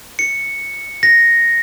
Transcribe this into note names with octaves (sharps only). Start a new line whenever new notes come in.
C#7
A#6